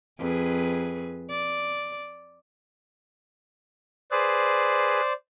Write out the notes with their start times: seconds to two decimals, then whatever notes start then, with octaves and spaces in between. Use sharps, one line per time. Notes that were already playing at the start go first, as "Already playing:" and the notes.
0.19 F2 G#4 B4
1.30 D5
4.11 G#4 B4 C5 D5